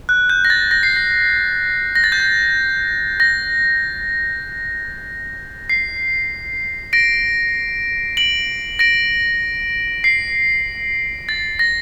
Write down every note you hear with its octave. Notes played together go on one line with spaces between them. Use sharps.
F#6
G6
A#6
A6
A#6
C7
A#6
A#6
A6
G6
A6
A#6
C7
A#6 D7
D7 F#7
A#6 D7
C7
A6
A#6